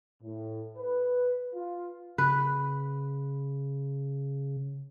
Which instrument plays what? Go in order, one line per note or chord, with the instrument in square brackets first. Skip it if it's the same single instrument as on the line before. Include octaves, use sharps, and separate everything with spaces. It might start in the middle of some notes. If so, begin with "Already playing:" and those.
[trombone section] A2
B4
F4
[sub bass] C#3 [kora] B4